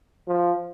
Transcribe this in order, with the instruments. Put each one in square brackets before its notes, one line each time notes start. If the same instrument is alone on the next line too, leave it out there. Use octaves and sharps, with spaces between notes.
[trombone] F3